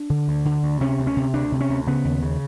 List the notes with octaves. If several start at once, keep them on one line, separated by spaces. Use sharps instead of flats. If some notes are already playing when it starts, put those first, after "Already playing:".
Already playing: D4
D3
D2
D3
D2
C3 C#4
D2
C#4
C3
D2 D4
C3
C#4
D2
C#3 B3
D#2
C#3